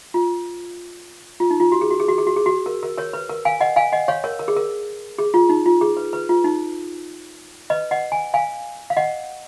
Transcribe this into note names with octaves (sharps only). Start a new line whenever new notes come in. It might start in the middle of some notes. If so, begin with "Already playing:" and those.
F4
F4
D#4
F4
F#4
G#4
F#4
G#4
F#4
G#4
F#4
G#4
F#4
A#4
A#4
A#4 C#5
B4
A#4
F5 G#5
D#5 F#5
F5 G#5
D#5 F#5
C#5 F5
A#4 C#5
A#4
G#4
A#4
G#4
F4
D#4
F4
G#4
B4
B4
F4
D#4
B4 D#5
D#5 F#5
G#5
F5 G#5
F5
D#5 F#5